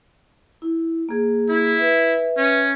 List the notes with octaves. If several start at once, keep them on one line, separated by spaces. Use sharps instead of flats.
E4
A#3 G#4
E4
B4 E5
C#4